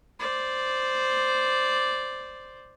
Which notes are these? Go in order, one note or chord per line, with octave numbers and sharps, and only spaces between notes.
C5 D5